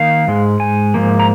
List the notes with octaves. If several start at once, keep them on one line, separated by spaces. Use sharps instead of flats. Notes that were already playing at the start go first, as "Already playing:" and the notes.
Already playing: D#3 A#3 F5
G#2 G#3
G#5
G#2 F3 A#3
A#5